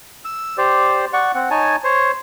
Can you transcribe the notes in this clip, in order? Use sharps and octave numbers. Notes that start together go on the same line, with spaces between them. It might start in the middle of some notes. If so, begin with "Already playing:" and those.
E6
G4 C5 D5
D5 F#5 C#6
C4 F#5
D#4 C#5 G#5 A5
C5 C#5